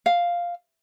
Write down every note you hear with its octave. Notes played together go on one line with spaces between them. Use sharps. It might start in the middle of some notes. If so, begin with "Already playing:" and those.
F5